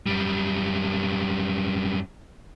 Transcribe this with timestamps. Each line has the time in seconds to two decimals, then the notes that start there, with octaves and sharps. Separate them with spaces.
0.06 F#2 G3